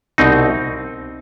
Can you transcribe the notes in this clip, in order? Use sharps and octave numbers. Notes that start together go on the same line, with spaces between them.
C2 B2 C4 D#4